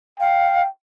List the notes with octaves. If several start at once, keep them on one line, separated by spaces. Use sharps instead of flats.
F5 G5